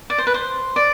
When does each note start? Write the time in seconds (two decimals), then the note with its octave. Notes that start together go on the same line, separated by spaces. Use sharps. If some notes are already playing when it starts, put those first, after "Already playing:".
0.10 D5
0.18 C5
0.27 B4
0.34 C5
0.76 D5